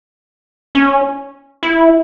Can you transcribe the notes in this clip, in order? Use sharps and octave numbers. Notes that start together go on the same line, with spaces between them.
C#4
E4